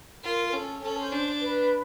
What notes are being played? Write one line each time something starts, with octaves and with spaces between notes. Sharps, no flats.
F4 A#4
A#4
C#4 A4
C#4 A4
C5
D4
B4